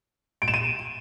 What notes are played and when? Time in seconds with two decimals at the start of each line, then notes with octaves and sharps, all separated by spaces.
0.42 D7
0.48 E7
0.54 D#7